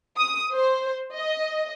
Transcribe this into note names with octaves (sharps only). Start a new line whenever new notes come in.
D#6
C5
D#5